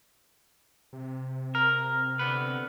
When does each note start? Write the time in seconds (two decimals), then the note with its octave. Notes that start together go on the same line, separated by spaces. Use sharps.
0.93 C3
1.55 A#4 F6
2.19 D3 B3 B4